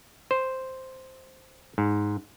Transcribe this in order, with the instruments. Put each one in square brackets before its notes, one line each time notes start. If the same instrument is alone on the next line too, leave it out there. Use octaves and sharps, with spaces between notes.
[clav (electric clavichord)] C5
G#2